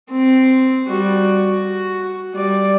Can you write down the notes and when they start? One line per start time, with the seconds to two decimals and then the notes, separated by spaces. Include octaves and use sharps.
0.11 C4
0.87 G3 F#4
1.44 F#4
2.34 G3 D5